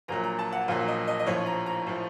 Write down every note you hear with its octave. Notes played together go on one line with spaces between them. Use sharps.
A#1 A#2 F#3 A#5
A#5
A5
F#5
A#1 A#2 F#3 F5
D#5
D#5
D#5
A#1 A2 F3 C#5
A#5
A#5
A2 F3